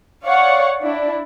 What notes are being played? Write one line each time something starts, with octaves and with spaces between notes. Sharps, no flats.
C#5 D5 F5 F#5 C#6
D4 E4